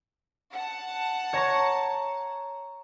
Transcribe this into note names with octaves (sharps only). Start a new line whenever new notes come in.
F#5 A5
C#5 A#5 C#6